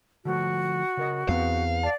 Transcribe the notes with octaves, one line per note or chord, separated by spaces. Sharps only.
D3 F3 A3 F#4
C#3 A#4 D#5
E2 B3 C4 B4 F5
D5 A5